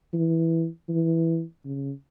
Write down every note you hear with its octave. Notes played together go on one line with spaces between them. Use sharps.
E3
E3
C#3